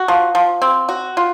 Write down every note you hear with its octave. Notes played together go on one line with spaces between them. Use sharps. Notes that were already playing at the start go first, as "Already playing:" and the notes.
Already playing: F#4
F3
F3
C4
F#4
F4